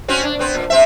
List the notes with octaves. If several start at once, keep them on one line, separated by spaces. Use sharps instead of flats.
C4 C#4 F#4
D4
B3 C4
A#2
C3 C4 E5